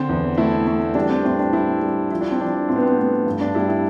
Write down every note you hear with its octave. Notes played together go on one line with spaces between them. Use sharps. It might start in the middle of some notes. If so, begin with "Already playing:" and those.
Already playing: D3 C4
E2
A3 E4
A3
G3 D4
C4
A2 C4
D4
G3 E4
G3
F3 E4
D4
C4
F3 D4
A2 C4
B3
C4
A3 B3
G2
D4
G3 E4
E4